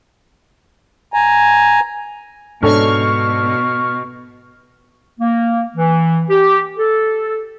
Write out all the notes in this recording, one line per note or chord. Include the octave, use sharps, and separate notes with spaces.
G#5 A#5
G#2 B2 D4 A4 C#5 C#6 F6
A#3
E3
G4
A4